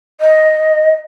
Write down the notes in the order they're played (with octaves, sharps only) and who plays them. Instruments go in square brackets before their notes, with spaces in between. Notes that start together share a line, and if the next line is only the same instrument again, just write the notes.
[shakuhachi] D#5